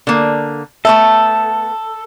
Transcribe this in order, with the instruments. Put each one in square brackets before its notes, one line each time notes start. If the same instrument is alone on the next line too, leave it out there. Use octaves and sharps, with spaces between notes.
[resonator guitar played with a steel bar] D3 A#3
[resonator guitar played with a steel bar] A3 B3 E5 [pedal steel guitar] A4